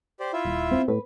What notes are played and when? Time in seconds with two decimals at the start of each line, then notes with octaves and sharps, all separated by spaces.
0.20 G4 C5 D5
0.33 E4 F4 E5
0.45 D#1
0.71 C4
0.88 A2 B4